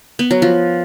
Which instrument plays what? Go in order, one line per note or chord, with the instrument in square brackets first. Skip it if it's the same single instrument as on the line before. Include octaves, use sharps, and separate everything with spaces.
[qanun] B3
F#3
F3